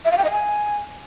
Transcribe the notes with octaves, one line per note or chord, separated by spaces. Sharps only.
E5
F5
G5
D#5
G#5